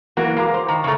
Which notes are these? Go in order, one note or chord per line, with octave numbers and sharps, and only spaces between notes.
E3 A#3 F#4
G#3 F5 A#5 D6
C5
D#3 A#5
C#3 A3 A#5 C#6